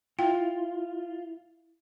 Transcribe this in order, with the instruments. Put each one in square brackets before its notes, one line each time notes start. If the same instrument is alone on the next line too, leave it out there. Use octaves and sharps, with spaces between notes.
[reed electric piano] E4 [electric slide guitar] F4 [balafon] G5